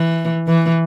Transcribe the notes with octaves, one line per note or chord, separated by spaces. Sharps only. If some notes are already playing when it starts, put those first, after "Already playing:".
Already playing: E3
E3